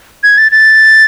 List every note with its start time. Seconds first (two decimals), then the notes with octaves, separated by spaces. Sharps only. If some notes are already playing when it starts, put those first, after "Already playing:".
0.23 G#6
0.38 A6
0.52 A6